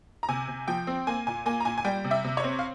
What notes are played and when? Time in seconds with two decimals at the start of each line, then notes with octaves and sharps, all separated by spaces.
0.23 A#5
0.29 C3 G#5
0.48 C3
0.68 F3 G5
0.87 C4
1.07 A#3 G#5
1.27 A#2 G#5
1.46 A#3 G#5
1.60 A#5
1.65 A#2 G#5
1.78 G#5
1.85 G3 G5
2.05 C3
2.11 E5
2.24 C3
2.37 C#5
2.44 C4
2.59 F5